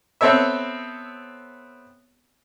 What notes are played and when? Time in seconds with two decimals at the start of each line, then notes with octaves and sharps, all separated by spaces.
0.21 B3 C4 A4 C#5 E5